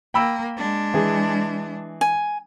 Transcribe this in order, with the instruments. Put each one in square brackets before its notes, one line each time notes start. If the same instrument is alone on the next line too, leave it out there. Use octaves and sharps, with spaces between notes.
[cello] A#3 [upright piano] G5 B5 E6
[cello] G#3 D4
[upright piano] E3 G#4
[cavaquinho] G#5